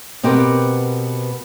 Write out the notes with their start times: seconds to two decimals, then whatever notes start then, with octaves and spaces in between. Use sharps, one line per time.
0.23 B2 B3 C4 G4 A#4 B4